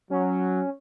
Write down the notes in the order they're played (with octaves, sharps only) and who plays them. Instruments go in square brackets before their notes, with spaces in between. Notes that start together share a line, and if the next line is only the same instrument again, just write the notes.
[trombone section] F#3 [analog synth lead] C#4